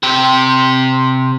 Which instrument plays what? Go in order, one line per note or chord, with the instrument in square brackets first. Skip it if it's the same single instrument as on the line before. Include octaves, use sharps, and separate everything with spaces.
[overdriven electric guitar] C3 G4